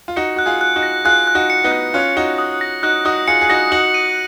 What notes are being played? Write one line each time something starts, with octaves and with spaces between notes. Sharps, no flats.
F4
D#4 F#4 C#7
F#4 F#6
F4 G#4
F#6
D#4 F#4
A#6
F4 G#4 F#6
F#6
D#4 F#4
C#7
B3 D#4
F#6
C#4 F4 F#6
D#4 F#4 C#7
D#6
A#6
D#4 F#4 F#6
D#4 F#4 D#6
F4 G#4 C#7
G#4
D#4 F#4 A#6
D#4 F#4 F#7
D#7